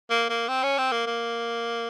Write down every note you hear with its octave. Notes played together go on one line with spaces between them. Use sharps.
A#3
A#3
C4
C#4
C4
A#3
A#3